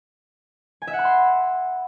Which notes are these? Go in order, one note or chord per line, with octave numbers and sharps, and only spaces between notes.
G#5
E5
F#5
B5
C6